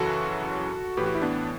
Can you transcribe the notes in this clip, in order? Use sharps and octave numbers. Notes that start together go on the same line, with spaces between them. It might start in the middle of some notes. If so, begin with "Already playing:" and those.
Already playing: F#2 C#3 E3 F#4 A4
A2 E3 G4 B4
F#4
E4
B3 D4